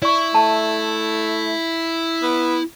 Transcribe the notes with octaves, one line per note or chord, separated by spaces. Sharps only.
E4 D5 C#6
A3 A5
B3